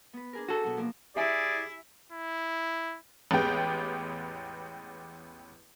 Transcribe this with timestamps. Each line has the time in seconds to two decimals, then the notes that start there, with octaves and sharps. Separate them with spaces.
0.13 B3 B4
0.33 D4 G#4 A#4
0.49 F#4 A4
0.64 B2 F#3
0.77 F3 A#3
1.16 E4 G4 G#4 D5 E5 G#5
2.12 E4
3.31 A1 E2 G#3 B3 G4 G5